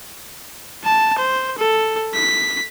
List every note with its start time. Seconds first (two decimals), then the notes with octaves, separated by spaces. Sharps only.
0.84 A5
1.19 C5
1.58 A4
2.14 B6